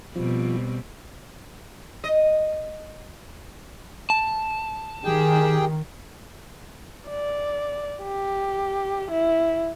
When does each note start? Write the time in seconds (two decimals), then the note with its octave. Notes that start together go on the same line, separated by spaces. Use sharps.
0.16 B2 F3 G3 C4
2.04 D#5
4.10 A5
5.05 D#3 G4 G#4 G5
7.09 D5
8.03 G4
9.11 E4